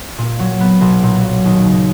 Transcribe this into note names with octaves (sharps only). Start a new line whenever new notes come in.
A#2
F#3
B3
B1
A#2
F#3
D#2
C#3